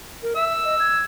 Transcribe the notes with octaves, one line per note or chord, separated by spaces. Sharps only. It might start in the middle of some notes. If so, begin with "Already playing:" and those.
A#4
E5 E6
D#5
G#6